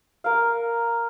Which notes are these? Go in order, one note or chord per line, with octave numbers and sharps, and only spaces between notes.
A#4 F5